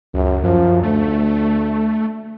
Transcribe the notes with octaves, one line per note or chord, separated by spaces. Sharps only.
C#2 F#2
F#2 F3
D2 A3